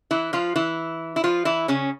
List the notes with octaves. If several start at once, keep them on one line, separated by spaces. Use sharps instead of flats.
E3 E4
F3 F4
E3 E4
E4
F3 F4
E3 E4
C#3 C#4